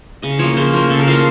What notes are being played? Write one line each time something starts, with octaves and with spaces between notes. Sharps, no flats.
C#3 D#5
F3 A#3 C#5
C#3 C5
F3 A#3 A#4
C#3 A4
A#4
F3 A#3 F5